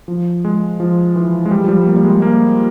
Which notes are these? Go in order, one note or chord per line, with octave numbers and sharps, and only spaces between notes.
F3
G#3
F3
E3
G#3
G3
F3
G3
A#3
G3
G#3
A#3